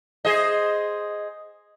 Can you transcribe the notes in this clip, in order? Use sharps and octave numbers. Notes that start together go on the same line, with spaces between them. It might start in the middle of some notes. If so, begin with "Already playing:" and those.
G#4 C5 D#5